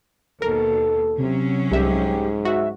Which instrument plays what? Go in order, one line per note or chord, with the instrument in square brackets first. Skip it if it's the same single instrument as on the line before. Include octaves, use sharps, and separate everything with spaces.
[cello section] D#2 B2 [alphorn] A4 [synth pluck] A#4
[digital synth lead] C3 [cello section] F#3 C#4
[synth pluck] C2 E5 [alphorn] G#2 [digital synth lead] G4
[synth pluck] F#4 [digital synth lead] E5